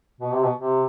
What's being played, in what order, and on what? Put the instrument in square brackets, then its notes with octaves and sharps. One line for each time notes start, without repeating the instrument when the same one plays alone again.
[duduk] B2
C3
B2
C3